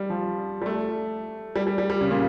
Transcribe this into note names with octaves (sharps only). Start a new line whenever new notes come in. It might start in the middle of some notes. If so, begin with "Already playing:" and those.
Already playing: G3
F3
G3
A3
G3
G3
G3
G3
C#3
A#2